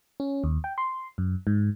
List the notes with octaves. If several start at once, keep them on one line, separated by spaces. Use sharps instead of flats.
C#4
D#2
G5
C6
F#2
G#2